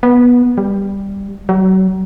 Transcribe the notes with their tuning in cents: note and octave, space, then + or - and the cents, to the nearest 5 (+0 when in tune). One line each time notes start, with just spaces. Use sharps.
B3 -15
G3 +10
F#3 +35